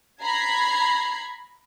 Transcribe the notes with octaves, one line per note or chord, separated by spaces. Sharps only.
A#5 B5 G#6 C7